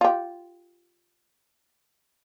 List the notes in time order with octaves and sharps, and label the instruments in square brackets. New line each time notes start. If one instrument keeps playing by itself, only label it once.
[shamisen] F4 G4